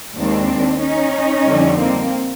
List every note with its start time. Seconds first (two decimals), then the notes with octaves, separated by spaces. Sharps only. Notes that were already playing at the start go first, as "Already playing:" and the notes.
0.16 D#2 D#3 G#3 C4 D4
0.80 C#4 D#4
1.44 F2 D3 G3
1.76 A#3 C4